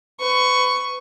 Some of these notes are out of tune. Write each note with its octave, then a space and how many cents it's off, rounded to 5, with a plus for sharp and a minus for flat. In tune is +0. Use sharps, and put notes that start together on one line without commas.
B4 +30 C#6 +0